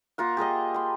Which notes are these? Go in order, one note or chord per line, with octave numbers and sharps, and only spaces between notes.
A#3 F4 A#4 F#5
G4 G#4 A#4 D#5
B5 C6